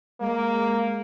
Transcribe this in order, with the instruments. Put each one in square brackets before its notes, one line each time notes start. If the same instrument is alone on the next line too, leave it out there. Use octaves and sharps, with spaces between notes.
[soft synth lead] G#3 [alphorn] A#3